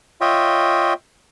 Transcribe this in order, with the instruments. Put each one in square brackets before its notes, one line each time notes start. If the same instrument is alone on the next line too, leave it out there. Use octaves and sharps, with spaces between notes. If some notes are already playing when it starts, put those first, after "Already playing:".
[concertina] F4 C#5 D#5 E5 G5